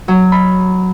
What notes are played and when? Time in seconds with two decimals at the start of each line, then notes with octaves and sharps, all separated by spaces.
0.08 F#3
0.32 B5